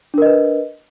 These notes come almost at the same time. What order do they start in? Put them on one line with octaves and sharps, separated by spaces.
D4 A#4 D#5 B4